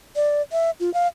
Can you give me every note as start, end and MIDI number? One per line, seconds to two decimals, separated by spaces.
0.16 0.42 74
0.52 0.71 76
0.80 0.92 65
0.94 1.08 77